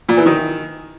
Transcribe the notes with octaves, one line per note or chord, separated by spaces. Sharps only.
A#2
E3
D#3